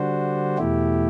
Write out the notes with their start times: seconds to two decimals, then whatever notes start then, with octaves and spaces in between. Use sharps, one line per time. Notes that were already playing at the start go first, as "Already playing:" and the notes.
Already playing: D3 G3 D4 F#4 C5
0.57 E2 B2 A3 E4 G4